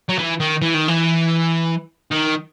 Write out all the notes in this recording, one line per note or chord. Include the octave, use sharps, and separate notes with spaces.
F#3
E3
D#3
E3
D#3
E3
D#3